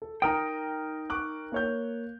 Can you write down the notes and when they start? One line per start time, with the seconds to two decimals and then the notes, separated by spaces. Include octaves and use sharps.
0.02 A4
0.22 D#4 A#4 G5 A#5 D#6
1.10 C#6 D6 F#6
1.52 A#3 C#5 G6